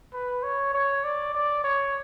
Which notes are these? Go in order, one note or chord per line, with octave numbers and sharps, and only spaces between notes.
B4
C#5
C#5
D5
D5
C#5